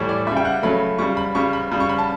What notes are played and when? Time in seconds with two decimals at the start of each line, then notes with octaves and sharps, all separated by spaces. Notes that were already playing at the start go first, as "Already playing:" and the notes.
Already playing: A2 E3 G3 C#5
0.09 D5
0.27 C#3 G3 E5
0.37 G5
0.45 F#5
0.63 C#3 F#3 A3 B5
0.98 C#3 G3 C#6
1.17 B5
1.35 C#3 G3 C#6
1.53 B5
1.71 C#3 G3 B5
1.80 C#6
1.89 B5
1.98 A5